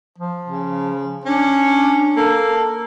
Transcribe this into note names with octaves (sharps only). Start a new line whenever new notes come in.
F3
C#3
C#4 D4
A#3 A4